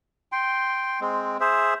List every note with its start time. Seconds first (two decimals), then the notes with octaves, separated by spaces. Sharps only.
0.32 G5 C6
1.01 G#3 C4
1.40 G#4 C5 E5